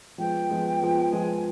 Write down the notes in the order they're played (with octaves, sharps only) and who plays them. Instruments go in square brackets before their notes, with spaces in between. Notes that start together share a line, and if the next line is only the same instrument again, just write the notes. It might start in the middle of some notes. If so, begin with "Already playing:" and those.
[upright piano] F3 G#3 B3 [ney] G5
[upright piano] F3 G#3 B3
F3 G#3 B3
[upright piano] F3 G#3 B3 [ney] G#5